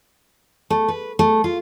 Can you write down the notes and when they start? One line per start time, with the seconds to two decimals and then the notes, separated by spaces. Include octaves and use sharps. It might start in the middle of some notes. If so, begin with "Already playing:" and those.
0.70 A3
0.88 B4
1.19 A3
1.44 F4